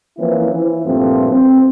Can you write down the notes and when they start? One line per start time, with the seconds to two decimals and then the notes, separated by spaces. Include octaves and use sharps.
0.18 E3 F3 A#3 C4 C#4 E4
0.52 E3
0.85 G2 A#2 F3 A3 C4
1.31 C4